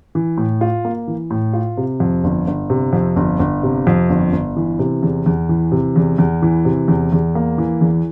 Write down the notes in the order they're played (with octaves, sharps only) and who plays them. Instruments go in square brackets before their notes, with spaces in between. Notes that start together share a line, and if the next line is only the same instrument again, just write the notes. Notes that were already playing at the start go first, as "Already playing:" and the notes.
[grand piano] E3
A2
F4
A#3
E3
A2
F4
C3
F2
G1
G1
C3
F2
G1
G1
C3
F2
G1
G1
E3
C3
E2
E2
E3
C3
E2
E2
E3
C3
E2
E2
A#3
E3
E2